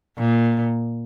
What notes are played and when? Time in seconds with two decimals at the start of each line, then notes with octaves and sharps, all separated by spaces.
0.18 A#2